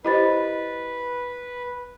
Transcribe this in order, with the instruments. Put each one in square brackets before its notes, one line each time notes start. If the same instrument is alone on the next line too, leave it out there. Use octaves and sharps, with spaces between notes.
[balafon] E4 G4 C5 [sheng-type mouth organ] B4 [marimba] D#5 B5 A6